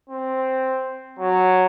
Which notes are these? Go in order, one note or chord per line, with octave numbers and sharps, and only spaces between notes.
C4
F#3